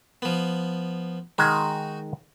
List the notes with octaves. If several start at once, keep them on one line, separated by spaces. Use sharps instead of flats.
F3 B3
D#3 G#3 D#4 F#4